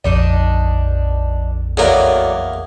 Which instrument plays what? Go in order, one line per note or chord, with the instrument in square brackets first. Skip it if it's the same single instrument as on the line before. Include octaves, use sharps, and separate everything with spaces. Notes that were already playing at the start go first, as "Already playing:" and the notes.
[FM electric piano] A#1 F2 [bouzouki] D4 D#4 D#5
[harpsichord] E2 A#3 [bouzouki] D3 F#3 D5